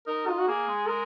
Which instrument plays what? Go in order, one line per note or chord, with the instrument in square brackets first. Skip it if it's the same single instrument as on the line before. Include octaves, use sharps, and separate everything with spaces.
[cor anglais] D#4 [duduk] A#4
[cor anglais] D#4 [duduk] F4
[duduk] F#4
[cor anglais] A#3 [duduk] G#4
[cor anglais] G#3
[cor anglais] G#3 [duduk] A#4